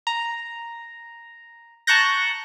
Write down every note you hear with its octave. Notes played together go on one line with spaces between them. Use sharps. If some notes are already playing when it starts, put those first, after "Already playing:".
A#5
A5 A#5 C#6 F#6 G6 A#6